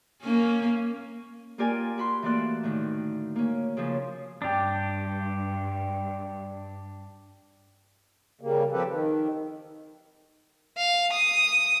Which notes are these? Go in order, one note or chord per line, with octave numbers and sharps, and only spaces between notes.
A#3 C#4
A#3 F4 G4 A#4 D5 G#5
F#4 B5 C6
E3 A3 A#3 A4 D5 F#6
A2 D3 D#3
A#3 C#4
C#3 F3 C#4 D4
G2 D4 G4
C#3 G3 A#3
F3 C4 G4 A4 B4
D#3
F5
D#6